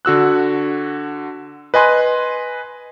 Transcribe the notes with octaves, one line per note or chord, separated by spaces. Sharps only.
D3 F#4 E6 F#6
B4 D#5 G#5 C6 F#6